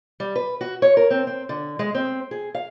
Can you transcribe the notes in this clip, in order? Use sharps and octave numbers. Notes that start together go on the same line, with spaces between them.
G3
B4
F#4
C#5
A#4
C4
C4
D3
G#3
C4
G#4
F5